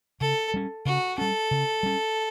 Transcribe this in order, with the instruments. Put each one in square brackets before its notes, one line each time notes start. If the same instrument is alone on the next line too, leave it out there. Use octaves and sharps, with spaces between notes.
[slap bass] C#3 [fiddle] A4
[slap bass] G3 C#4
[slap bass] C#3 [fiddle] F#4
[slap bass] G3 C#4 [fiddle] A4
[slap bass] C#3
G3 C#4